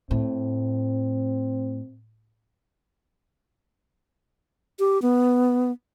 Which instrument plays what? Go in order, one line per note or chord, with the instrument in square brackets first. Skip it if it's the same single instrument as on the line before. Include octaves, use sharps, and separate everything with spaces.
[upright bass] A2 [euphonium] C4
[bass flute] G4
B3